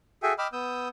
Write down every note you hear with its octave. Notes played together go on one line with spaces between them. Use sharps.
F#4 G#4 A4 E5 G5 G#5
D#5 G5 B5 D6 E6 F6
B3 D#6 E6 G6